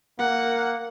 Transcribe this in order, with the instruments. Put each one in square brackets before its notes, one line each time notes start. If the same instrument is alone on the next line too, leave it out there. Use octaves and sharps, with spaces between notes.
[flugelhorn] A#3 [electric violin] F#5